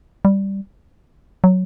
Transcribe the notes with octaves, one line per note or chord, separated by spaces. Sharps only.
G3
F#3